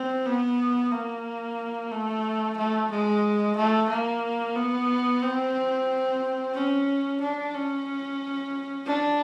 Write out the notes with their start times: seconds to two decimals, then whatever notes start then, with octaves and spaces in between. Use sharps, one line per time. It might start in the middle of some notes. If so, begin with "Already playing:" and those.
Already playing: C4
0.26 B3
0.91 A#3
1.91 A3
2.57 A3
2.91 G#3
3.56 A3
3.90 A#3
4.56 B3
5.22 C4
6.54 C#4
7.21 D4
7.54 C#4
8.86 D4